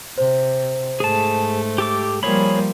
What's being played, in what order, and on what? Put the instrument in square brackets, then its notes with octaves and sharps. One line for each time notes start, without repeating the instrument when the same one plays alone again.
[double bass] C3 [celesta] C5
[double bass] G#2 [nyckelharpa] A3 [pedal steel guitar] G#4 A5
[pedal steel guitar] G4 A4 D6
[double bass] F3 G3 [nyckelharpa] A#3 [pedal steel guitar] G#4 C#5 B5